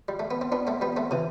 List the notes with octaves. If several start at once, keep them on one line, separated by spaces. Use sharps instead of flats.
G3
A3
B3
C4
B3 D4
A3 C4
G3 B3
A3 C4
C3 E3